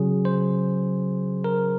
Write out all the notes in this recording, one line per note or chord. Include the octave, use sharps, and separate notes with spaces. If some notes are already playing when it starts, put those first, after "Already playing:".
Already playing: C#3 F#3 G#4
C5
A#4